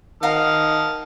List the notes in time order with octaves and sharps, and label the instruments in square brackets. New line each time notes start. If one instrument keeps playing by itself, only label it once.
[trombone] D#3 [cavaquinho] F5 F#5 A#5 [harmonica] A5 D#6 F6